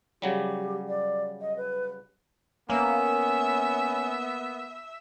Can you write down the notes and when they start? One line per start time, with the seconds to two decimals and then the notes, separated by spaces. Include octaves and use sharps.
0.22 C#3 F#3 G3 G4
0.88 D5
1.41 D#5
1.57 B4
2.70 A#3 B3 C#4 E5